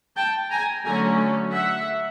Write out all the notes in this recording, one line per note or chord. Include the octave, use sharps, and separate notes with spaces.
G5 A5
G#5 A#5
D3 F#3 A3 C#4 G#5 A#5
E5 F#5